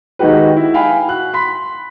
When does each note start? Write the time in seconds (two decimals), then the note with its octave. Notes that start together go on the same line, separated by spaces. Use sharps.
0.19 D#3 G#3 D#4 F#4 G4 B4
0.57 E4
0.74 F5 G5 G#5 B5
1.08 F#4 F#6
1.33 B5 C6 B6